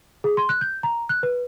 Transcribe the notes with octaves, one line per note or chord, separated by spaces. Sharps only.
G#4
C6
F#6
G6
A#5
F#6
B4